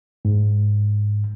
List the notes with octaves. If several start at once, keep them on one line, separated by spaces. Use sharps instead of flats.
G#2